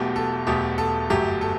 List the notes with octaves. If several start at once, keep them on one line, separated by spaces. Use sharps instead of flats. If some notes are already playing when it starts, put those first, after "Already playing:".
Already playing: E1 E2 B2 F#3 A3 G4
A4
E1 E2 B2 F#3 A3 G4
A4
G1 F#2 F#3 A3 G4
A4